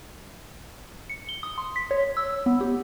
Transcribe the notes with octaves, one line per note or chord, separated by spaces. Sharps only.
C#7
G7
D#6
C6
B6
C#5
E6
B3
G4